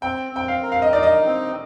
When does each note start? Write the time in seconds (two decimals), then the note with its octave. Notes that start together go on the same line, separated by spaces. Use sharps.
0.02 C4 G5
0.32 C4 G5
0.48 F5
0.63 A#4
0.72 F5
0.82 D#5
0.93 D#4 D5
1.03 D#5
1.26 C4